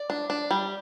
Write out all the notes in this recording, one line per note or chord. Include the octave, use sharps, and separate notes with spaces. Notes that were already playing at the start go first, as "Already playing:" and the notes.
Already playing: D5
D4
D4
G3